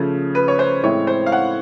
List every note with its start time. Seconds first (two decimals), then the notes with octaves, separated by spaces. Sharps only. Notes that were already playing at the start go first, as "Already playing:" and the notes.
Already playing: C#3 F3 A3 C#4
0.35 B4
0.48 C#5
0.59 C5
0.83 A2 E3 G#3 C4 E4 C#5
1.07 C5
1.26 F5
1.32 F#5